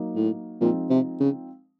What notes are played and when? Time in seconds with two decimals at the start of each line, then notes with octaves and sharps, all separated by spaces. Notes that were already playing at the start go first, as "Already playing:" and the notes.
Already playing: F#3 A#3 D#4
0.16 A2
0.61 A#2 F3 G#3 C4 D#4
0.90 C3
1.20 C#3